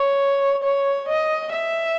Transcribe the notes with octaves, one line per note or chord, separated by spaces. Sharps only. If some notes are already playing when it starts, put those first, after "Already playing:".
Already playing: C#5
C#5
D#5
E5